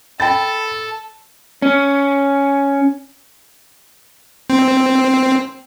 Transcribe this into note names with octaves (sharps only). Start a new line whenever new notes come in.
A4 G5 B5 A6
C#4
C4